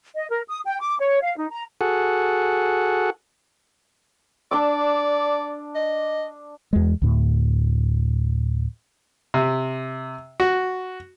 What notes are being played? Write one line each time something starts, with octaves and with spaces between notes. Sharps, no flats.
D#5
A#4
D#6
G5
D6
C#5
F5
D#4
A#5
F#4 G#4 A4 F#5
D4 D5 D6 E6
D#5
E2 G#3
D2 A2
C3
F#4